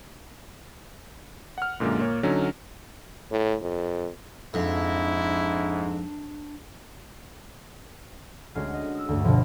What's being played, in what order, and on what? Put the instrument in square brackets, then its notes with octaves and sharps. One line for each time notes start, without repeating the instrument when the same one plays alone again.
[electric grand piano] F#5 F6
F#2 A#2 D3 G#3 A#3
A#2 A#3 C#5
D3 F#3 C#4 D#4
[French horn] A2
F2
[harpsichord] F2 [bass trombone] G#2 [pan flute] D4 [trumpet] E4
[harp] D2 G#3 C#4 F#4 F6 C7
D#5
D#6 E6
D2 G2
G1 B2 F3 A3